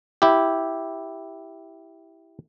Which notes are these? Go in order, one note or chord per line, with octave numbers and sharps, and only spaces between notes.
E4 G4